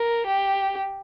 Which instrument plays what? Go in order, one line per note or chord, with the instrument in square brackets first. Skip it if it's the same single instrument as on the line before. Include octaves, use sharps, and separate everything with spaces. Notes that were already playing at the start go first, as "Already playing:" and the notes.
Already playing: [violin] A#4
G4